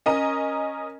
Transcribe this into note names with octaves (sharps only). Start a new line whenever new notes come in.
C#4 A#4 D#5 A#5 D#7